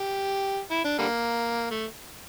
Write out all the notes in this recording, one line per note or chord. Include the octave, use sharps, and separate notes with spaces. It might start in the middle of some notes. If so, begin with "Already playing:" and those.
Already playing: G4
E4
D4
D3 G3 A#3
A3